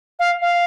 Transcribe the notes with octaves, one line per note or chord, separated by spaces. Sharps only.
F5
F5